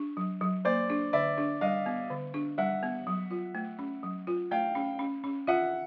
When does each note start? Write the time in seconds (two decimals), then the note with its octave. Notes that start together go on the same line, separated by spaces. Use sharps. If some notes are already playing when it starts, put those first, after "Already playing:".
Already playing: D4
0.17 F#3
0.41 F#3
0.65 A#3 C5 D5
0.90 D4
1.13 D3 D5 E5
1.38 D4
1.61 G3 D#5 F5
1.86 B3
2.10 D3
2.34 D4
2.58 G3 E5 F#5
2.83 B3
3.07 F#3
3.31 F4
3.55 A3
3.79 C#4
4.03 F#3
4.27 F4
4.51 A3 F5 G5
4.75 C#4
4.99 C#4
5.24 C#4
5.47 F4 E5 F#5